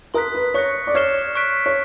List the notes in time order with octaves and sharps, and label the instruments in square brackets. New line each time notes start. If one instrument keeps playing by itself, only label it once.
[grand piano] A#4 [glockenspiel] C6 D#6 F#6 B6
[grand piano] B4
[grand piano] C#5 [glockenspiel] C#6 F#6 A#6 C#7
[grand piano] D5
[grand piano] C#5 [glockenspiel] F6 G#6 C7 E7 G7
[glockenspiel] C#6 F#6 B6 D7
[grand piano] C#5